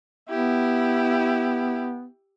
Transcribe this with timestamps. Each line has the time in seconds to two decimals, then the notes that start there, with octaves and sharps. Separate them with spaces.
0.29 B3 E4 G4